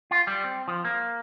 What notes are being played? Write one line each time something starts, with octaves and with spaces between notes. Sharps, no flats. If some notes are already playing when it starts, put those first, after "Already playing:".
F4
G3
C4
F3
A#3